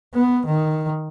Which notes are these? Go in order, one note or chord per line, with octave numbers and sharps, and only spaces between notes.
B3
D#3